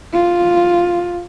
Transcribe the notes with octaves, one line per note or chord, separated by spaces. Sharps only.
F4